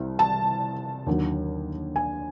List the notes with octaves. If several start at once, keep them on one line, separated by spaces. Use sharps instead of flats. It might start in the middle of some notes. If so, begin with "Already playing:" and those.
Already playing: C2 C3
A5
D#2 D3 F#3
G#5